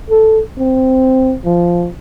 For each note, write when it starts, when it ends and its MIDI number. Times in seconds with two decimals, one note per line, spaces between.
0.10 0.41 69
0.59 1.35 60
1.45 1.88 53